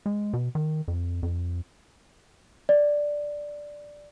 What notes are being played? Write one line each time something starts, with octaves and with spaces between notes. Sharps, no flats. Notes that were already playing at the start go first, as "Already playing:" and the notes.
G#3
B2
D#3
F2
F2
D5